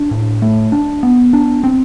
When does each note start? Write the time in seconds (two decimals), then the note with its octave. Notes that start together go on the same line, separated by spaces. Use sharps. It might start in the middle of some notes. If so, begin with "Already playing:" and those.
Already playing: D4
0.11 A2
0.42 A3
0.72 D4
1.03 B3
1.33 D4
1.64 C4